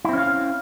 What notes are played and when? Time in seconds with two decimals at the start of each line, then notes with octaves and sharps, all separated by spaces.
0.05 E4
0.09 C4
0.13 C#4
0.18 F5